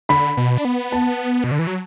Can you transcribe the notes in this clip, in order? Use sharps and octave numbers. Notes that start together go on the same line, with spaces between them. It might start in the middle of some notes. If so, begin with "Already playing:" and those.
D3 B5
B2
D4
B3
A5
B2
D3
E3
F#3